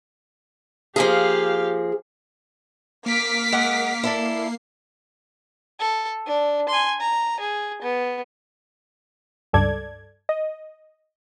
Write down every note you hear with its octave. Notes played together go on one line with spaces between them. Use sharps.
F3 A#3 G4 G#4 F5
A#3 D6 F6 B6 C7
G#3 F#5
E4 A4 D5
A4
D4
G#5 C6
A#5
G#4
B3
C#2 G2 A4 D5 G#6
D#5